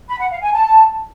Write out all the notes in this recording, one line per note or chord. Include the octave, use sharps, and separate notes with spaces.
B5
F#5
F5
G#5
A5